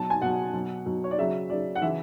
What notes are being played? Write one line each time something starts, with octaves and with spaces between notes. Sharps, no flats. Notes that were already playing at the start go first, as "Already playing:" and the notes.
Already playing: B2 F#3 A5
G#5
B2 F#3 F#5
B2 F#3
B2 F#3
C#5
D5
C#3 F#3 E5
C#3 F#3 D5
F#5
C#3 E3 E5